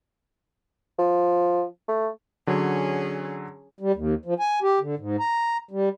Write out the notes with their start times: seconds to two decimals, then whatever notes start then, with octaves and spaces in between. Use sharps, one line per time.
0.99 F3
1.88 A3
2.47 D3 F#3 C#4 G#4
3.80 G3
3.95 D#2
4.25 F3
4.40 G#5
4.62 G4
4.80 D3
4.98 G#2
5.20 A#5
5.71 G3